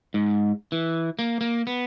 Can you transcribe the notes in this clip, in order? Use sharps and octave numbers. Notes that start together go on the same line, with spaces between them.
G#2
E3
A#3
A#3
B3